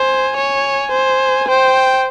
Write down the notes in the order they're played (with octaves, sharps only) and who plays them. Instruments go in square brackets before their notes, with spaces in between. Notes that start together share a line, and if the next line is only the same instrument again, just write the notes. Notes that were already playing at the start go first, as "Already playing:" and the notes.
Already playing: [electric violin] C5 [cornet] G#5
[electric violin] C#5
C5
[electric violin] C5 [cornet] G5